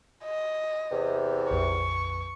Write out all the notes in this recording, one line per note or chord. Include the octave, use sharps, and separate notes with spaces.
D#5
E2 C3
A#1 F2 B4 C#6